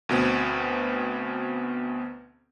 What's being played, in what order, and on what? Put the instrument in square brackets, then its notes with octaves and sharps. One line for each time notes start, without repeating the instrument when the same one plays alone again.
[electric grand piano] D2 B2 B3 C4